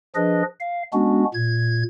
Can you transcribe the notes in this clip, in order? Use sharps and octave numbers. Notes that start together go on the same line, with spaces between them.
F3 D4 G#4 B4 D#5
F5
G#3 B3 C#4 D4 F#4
A#2 G#6